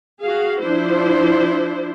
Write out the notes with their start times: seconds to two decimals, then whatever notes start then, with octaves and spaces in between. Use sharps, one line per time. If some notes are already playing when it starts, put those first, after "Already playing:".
0.23 F#4 G#4 F5
0.61 F3 D4 E4 C5